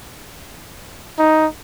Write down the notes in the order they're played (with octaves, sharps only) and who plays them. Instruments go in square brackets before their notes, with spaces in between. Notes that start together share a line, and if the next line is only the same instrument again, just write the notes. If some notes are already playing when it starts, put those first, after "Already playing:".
[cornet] D#4